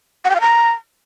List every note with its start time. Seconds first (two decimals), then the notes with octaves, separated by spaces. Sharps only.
0.25 F#5
0.30 G5
0.35 F5
0.41 A#5